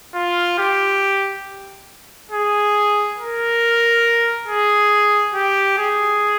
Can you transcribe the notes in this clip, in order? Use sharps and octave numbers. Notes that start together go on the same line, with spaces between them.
F4
G4
G#4
A#4
G#4
G4
G#4